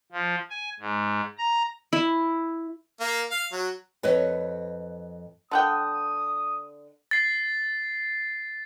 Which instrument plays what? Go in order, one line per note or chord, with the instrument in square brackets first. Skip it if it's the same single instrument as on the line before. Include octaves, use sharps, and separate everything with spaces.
[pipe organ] F3
G#5
G#2
A#5
[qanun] E4
[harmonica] A#3
F5
F#3
[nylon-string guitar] F2 B4 C#5 D#5
[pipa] D3 F#5 G5 [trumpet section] D#6
[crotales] A6 C7